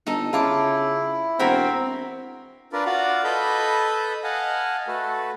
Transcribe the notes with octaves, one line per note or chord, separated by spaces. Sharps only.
G1 D#4 A4
C#3 E4 F4 A5 D6
E1 C4 F#4 A#4 B5
D4 F4 A#4 B4 D5
F4 F#4 D5 F5 F#5
A4 B4 D#5 B5 G6
D#5 F5 F#5 G#5 A5
A3 F#4 A4 B4